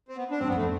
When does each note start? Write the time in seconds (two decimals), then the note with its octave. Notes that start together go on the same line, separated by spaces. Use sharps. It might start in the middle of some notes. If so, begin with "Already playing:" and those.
0.08 C4
0.17 B3
0.31 D4
0.40 G2 C4
0.48 B3
0.52 F2 A3